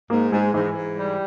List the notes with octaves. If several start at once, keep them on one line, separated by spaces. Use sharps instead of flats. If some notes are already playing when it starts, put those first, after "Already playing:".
G#2 A#3
G#2 G#3
G#2 E3
G#2
G3